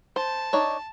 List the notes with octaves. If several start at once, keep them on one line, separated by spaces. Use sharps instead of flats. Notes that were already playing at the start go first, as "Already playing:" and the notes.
C5 A5
D4 D#4 C#5